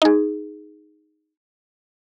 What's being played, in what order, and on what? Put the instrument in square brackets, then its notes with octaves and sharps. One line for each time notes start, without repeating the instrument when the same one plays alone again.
[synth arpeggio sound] D#4 G#4